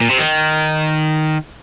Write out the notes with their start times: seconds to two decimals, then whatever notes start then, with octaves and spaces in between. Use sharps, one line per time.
0.01 A#2
0.10 C3
0.20 D#3